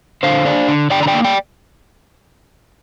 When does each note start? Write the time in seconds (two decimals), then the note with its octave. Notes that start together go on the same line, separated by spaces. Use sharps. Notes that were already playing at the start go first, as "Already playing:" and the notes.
0.23 D3 C5 F5
0.45 D4
0.68 D3
0.90 D3 D5 G5
1.03 A#5
1.07 D5 G5
1.14 A#3
1.24 D5 G5